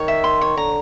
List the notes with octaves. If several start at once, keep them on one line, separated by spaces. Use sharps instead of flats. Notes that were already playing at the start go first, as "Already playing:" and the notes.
Already playing: D#3 C#5
E5
C6
C#5
D3 A#5